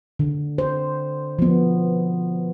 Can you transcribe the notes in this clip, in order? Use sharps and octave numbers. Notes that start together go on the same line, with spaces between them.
D3
C5
F3 B3